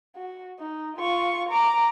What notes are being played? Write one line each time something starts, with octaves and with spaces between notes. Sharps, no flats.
F#4
D#4
F4 C#6
A#5 D6